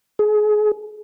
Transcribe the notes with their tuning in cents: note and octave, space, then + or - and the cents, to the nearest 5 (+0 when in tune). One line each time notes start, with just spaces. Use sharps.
G#4 +30